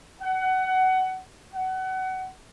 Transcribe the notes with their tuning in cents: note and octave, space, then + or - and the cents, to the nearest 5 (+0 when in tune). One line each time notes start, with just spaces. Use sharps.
F#5 +20
F#5 +25